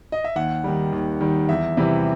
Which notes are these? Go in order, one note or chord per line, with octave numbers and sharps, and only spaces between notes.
D#5
E5
D#2 F#5
D#3 G3
D#2
D#3 G3
E2 E5
C3 E3 G3